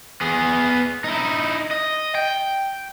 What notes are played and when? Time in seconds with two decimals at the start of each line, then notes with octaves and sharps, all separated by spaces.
0.21 B3 G#4
1.04 D#4 E4
1.71 D#5
2.15 G5